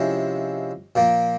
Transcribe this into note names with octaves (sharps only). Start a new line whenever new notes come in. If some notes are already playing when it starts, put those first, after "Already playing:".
Already playing: C3 F3 G#3 C#4 E4
A#2 F3 A#3